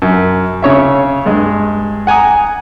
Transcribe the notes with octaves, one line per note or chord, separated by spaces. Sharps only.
F#2
C#3 C#5 E5
G2 G#3
F#5 G#5 A#5 D#6